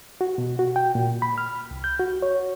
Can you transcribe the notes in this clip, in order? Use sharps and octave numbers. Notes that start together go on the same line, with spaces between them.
F#4
B2
F#4
G5
A#2
B5
F6
C2
G6
F#4
C#5